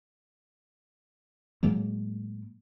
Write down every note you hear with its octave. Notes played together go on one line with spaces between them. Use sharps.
A2 F#3 G#3 A#3